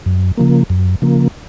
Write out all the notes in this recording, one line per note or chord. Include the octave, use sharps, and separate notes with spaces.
F#2
C#3 F3 A#3
F#2
C#3 F3 A#3